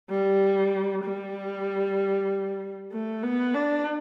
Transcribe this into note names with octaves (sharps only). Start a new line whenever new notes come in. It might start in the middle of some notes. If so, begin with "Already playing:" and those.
G3
G3
A3
B3
D4